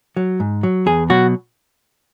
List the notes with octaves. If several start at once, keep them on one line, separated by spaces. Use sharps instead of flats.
F#3
G#2
F#3
E2 G#4
B2 F#3 F#4